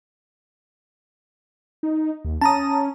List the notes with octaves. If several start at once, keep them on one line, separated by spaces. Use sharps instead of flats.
D#4
D#2
C#4 A5 A#5 D#6